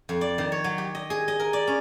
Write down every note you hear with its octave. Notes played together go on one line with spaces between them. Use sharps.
F2
D5
D#3
C#5
F#3
G4
D#5
G#4
D#5
A#4
D5
C#4